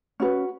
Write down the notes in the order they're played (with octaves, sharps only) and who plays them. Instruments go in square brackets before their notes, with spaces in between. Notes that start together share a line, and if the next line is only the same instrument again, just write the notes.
[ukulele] C#4 F#4 B4